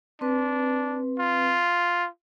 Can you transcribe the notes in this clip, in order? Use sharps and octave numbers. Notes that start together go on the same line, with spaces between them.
C4 D4 B4
F4